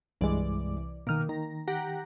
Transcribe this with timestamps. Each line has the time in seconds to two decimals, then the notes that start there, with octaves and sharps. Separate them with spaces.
0.21 C2 G2 E3 G#3 D5
1.07 B2 D#3 A#3 F6
1.29 D#3 A#5
1.68 G4 F#5 A#5